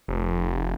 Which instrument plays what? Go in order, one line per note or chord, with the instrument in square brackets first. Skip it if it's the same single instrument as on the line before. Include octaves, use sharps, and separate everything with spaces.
[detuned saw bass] F1